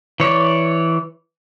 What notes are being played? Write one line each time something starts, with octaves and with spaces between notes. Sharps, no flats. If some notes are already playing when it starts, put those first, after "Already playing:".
E3 C#5 D5